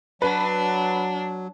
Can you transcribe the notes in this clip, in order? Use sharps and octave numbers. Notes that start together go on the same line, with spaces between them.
F#3 D4 B4